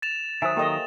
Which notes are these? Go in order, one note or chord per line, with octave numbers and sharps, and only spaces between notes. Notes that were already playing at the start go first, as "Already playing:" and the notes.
A6 E7 F7
D#3 F#3 C5 E5 G#5 D#6
A#3 G4 A4 D#5 G5